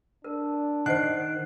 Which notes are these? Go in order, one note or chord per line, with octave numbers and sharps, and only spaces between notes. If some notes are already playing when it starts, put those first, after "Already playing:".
D4 A#4
D#3 C5 D#5 F#5 F#6 C7